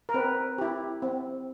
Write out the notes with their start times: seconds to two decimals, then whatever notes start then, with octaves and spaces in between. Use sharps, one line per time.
0.09 A#4
0.14 C4 B4
0.58 E4 G4
1.02 C4